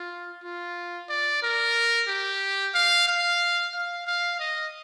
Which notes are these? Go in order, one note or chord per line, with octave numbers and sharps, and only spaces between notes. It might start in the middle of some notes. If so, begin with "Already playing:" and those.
Already playing: F4
F4
D5
A#4
G4
F5
F5
F5
F5
D#5